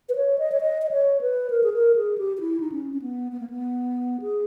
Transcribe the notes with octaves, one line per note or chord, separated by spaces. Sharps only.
B4
C#5
D#5
C#5
D#5
D#5
C#5
B4
A#4
G#4
A#4
G#4
G4
G4
E4
D#4
C#4
C#4
B3
B3
A#3
B3
G#4